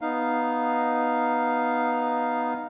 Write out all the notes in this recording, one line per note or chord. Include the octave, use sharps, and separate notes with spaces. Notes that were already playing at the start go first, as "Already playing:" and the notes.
B3 D#4 F5